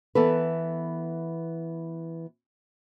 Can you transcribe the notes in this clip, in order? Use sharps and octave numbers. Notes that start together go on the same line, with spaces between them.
E3 B3 A4 B4